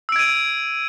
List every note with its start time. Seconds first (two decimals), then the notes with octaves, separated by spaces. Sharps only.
0.09 E6
0.12 D7
0.16 G#6
0.19 D#7